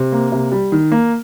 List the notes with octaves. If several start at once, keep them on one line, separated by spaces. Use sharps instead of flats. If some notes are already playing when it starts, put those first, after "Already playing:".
Already playing: C3
A#3
C3
G3
D#3
A#3